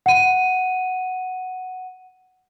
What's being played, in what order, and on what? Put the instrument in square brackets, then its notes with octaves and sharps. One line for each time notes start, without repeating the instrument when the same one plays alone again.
[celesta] F#5 D#7